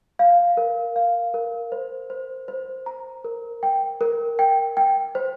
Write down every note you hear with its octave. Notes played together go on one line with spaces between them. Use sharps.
F5
A#4
F5
A#4
C5
C5
C5
A#5
A#4
G5
A#4
G5
G5
C5